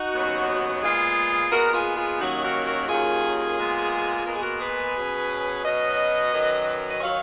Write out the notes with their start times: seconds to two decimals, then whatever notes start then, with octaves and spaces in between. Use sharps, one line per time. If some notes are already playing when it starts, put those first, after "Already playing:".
Already playing: D#4 F#4
0.14 D#2 C#3 F#3 B3
0.82 A#2 G#3 B3 F4 G#4
1.51 A#2 G#3 B3 F#4 A#4
1.68 F#4
1.74 F4 G#4
1.97 F4 G#4
2.20 D#2 D#3 F#3 A#3 C#4 D#4 F#4
2.43 F#4 A#4
2.65 F#4 A#4
2.88 D#2 D#3 F#3 A#3 C#4 F4 G#4
3.58 A#2 G#3 B3
4.26 A#2 G#3 B3 A#4
4.34 G#4
4.41 F#4 A#4
4.60 G#4 B4
4.95 B2 F#3 C#4
5.64 B2 F#3 C#4 B4 D#5
6.32 F#2 D#3 F#3
6.90 D#5
7.01 D#3 F#3 C#5 F5